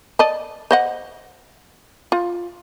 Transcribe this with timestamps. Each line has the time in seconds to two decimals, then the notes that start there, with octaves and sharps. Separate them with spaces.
0.19 D5 D#5 A5
0.71 C5 D#5 F#5
2.12 F4